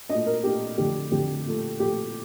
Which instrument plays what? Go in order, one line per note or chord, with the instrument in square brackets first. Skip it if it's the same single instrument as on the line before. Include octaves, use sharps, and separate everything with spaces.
[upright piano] A#2 A3 D4 D#5
A#4
A#2 A3 D4 G4
F2 D3 A3 D4 G4
F2 D3 A3 D4 G4
A#2 F3 A3
A#2 F3 A3 G4